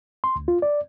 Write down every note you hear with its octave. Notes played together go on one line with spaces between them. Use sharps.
C6
D2
F4
D5